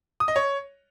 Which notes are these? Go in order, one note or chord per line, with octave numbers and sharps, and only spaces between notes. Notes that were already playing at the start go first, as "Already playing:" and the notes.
D#6
D#5
C#5